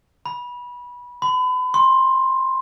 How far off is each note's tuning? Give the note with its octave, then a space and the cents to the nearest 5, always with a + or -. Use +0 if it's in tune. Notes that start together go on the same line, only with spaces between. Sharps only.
B5 -20
B5 +35
C6 +15